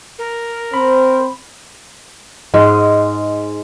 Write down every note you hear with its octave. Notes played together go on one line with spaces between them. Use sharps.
A#4
C4 C5 B5
G#2 G#3